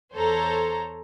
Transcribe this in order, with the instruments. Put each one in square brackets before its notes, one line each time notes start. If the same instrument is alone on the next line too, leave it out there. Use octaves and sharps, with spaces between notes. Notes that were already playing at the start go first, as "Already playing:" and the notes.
[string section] E2 A4 C5 C#5 A#5